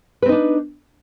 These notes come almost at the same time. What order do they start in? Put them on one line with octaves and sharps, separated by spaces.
B4 C4 D#4 D4